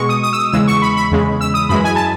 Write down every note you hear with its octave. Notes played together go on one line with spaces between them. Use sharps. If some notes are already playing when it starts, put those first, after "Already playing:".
Already playing: B2 G#3 C#6
D#6
D#6
E6
D#6
E2 C#3 G#3 E6
C#6
B5
B5
E2 C#3 G#3
E6
D#6
F#2 E3 G#3 B5
G#5
A5